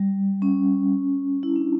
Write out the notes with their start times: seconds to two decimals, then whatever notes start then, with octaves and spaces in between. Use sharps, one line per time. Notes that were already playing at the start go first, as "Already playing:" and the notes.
Already playing: G3
0.42 C#4
1.43 E4
1.56 D4